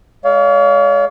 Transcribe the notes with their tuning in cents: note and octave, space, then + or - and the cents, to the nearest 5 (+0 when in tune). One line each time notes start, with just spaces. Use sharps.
G#3 +0 C#5 +45 F5 +0